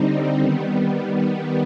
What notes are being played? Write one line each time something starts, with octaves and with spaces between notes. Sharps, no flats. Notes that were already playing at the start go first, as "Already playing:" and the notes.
Already playing: D3 G3 C4 D#4
D#3 G3 B3